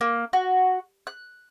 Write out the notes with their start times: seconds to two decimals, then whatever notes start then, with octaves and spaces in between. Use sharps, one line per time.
0.01 A#3
0.33 F#4
1.07 F#6